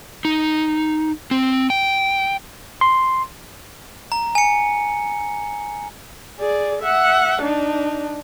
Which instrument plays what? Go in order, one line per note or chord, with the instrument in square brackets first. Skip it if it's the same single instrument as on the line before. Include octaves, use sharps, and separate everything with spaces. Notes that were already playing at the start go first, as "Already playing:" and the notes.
[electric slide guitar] D#4
C4
G5
[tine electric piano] C6
[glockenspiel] A#5
G#5 C#7
[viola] G#4 D5
E5 F#5
D4 D#4